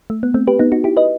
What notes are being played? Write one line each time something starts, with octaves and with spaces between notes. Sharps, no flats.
A3
B3
A3 C4
G4 B4
B3 D#4
D#4 F#4
E4 G4
B4 D#5